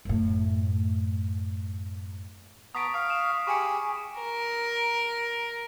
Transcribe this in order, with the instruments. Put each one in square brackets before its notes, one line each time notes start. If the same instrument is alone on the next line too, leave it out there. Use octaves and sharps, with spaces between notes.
[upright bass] F#2 A2
[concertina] B3 A5 A#5 [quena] C#6 [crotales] D#6 B6 D7
[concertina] F5 [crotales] D#6
[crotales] E7
[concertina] G4 G#4 B5 [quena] G#5 [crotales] C#6 C#7
[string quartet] A#4